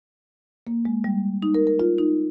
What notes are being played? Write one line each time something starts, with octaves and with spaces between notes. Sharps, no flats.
A#3
G#3
G3
D#4
A#4
A#4
F4
D#4